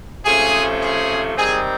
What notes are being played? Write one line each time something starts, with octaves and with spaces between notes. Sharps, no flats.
C3 F3 A3 C#4 G#4
G#4
D#3 G3 C4 G#4